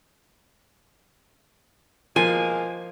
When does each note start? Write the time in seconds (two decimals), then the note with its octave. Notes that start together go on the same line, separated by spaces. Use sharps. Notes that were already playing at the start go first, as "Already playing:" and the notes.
2.16 B2 F3 G#3 A#3 G#5